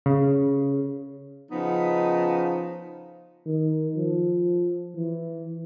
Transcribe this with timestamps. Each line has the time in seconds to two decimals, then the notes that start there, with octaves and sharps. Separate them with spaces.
0.06 C#3
1.52 C#3 F3 B3 D#4
3.46 D#3
3.95 F3
4.96 E3